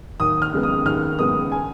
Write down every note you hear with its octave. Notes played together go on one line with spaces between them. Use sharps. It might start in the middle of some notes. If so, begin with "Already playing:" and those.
D#2 D#6
F6
C#3 G#3 B3
D#6
D#2 F6
C#3 G#3 B3 D#6
G#5